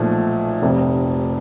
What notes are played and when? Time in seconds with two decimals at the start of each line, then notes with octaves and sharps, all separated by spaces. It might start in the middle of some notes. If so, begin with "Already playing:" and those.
Already playing: B1 A#2 F3 A3
0.62 F1 F2 C3